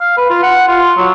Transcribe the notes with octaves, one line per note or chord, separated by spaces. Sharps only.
F5
B4
F4
F#5
F4
F#3